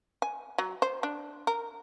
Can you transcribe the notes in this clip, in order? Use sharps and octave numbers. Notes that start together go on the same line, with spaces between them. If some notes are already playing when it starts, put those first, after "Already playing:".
G#5
F#3
C5
D4
A#4